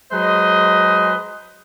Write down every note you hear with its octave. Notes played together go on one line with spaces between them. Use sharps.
F#3 G#3 B4 C5 D#5